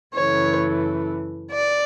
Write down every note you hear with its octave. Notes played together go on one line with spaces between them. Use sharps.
F#2 C#3 E3 A3 C#5
D5